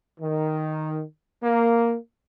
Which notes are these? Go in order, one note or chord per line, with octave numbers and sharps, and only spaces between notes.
D#3
A#3